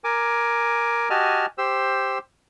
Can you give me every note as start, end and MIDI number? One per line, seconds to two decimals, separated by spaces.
0.04 1.09 70
0.04 1.09 80
0.04 1.09 86
1.10 1.46 66
1.10 1.46 67
1.10 1.46 75
1.10 1.46 80
1.10 1.46 81
1.10 1.46 89
1.58 2.18 67
1.58 2.18 72
1.58 2.18 88